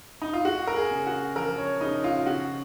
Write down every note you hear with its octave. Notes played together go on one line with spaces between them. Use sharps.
D#4
F4
G#3 F#4
A#4
G#4
C#3
F#4
F3 A#4
C#5
C#3 D#4
F4
C#3 F#4